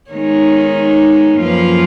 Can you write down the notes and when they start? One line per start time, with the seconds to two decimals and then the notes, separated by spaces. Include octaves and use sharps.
0.12 D#3 G#3 B3 D#4 C#5
1.41 F#2 F3 A#3 F4 B4